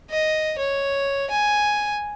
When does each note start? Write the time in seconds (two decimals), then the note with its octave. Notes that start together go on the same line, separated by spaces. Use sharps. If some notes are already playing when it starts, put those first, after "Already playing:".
0.10 D#5
0.58 C#5
1.30 G#5